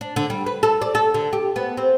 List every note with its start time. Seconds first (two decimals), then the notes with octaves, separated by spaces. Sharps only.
0.01 D4
0.16 D3
0.30 G3
0.46 B4
0.63 A4
0.82 D5
0.95 A4
1.14 D3
1.33 G4
1.56 B3
1.77 C4